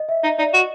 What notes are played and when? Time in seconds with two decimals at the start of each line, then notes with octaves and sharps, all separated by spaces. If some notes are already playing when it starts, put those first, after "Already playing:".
Already playing: D#5
0.09 E5
0.23 D#4 D#5
0.38 D#4 D5
0.53 F#4 D#5